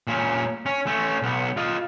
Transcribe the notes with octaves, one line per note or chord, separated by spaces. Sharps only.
A#2 C#4
C#4
A3 C#4
B1 B3
F4 D#5